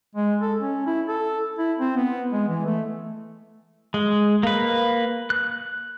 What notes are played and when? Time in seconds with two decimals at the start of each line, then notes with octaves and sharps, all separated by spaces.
0.15 G#3
0.42 A4
0.59 C#4
0.87 E4
1.08 A4
1.59 E4
1.79 C4
1.97 B3
2.33 G#3
2.48 E3
2.66 A3
3.94 G#3
4.43 A#3 B4
5.30 F#6